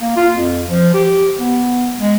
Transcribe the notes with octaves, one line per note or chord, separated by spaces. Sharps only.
A#3
F4
F2
F3
G4
B3
G#3